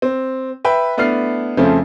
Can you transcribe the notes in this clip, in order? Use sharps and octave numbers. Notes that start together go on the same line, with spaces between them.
C4
B4 E5 G5
A3 B3 D4 E4 F6 C7
F2 C#3 F3 A3 C4 C#4